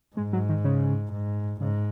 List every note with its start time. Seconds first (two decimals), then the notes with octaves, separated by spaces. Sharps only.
0.16 G#2 G#3
0.33 F#3
0.49 D#3
0.64 C#3
1.12 G#2
1.61 G#2 C#3